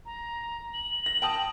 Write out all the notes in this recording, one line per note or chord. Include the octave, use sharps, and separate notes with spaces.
A#5
F#7
A#6
G5 A5 D#6